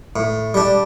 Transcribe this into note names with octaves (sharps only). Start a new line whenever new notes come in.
A2
G3 D4